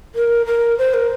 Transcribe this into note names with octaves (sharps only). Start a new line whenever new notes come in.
A#4
A#4
C5
A#4